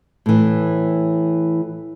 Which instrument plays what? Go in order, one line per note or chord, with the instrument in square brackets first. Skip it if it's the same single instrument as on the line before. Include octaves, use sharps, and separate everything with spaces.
[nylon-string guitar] A2 E3